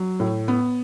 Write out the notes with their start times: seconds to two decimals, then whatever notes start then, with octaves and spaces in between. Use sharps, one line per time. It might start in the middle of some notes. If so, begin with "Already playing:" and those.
Already playing: F#3
0.20 A2
0.48 B3